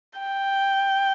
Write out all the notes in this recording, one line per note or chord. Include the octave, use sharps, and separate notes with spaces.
G5